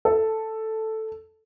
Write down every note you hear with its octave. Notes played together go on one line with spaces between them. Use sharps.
A4